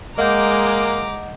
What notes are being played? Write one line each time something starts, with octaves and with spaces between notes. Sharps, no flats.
G#3 A#3 D#5 F#5 A#5 D6 G6